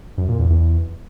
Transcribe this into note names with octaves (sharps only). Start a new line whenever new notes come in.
F#2
A#2
E2
E2